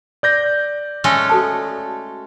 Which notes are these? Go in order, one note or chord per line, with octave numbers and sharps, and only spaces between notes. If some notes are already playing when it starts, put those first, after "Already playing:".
D5 G6 A#6
G#3 A3 C#4
F#4 A4 A5